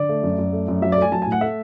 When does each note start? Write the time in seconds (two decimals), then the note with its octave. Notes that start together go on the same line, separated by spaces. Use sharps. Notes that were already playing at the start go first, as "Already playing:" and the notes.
Already playing: D3 D5
0.09 A3
0.23 F#2
0.38 F#2
0.53 A3
0.68 F#2
0.82 F#3 E5
0.92 D5
0.97 A3 G#5
1.12 F#3 A5
1.22 A2 G#5
1.32 F#5
1.41 A3 E5